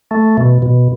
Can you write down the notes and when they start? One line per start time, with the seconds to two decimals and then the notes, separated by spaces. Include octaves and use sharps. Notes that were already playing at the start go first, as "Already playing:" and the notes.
0.11 A3
0.38 B2
0.62 B2